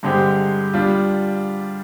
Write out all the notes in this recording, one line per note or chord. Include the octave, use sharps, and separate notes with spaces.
G2 D3 G#3 C4 G4
G3 D4 F4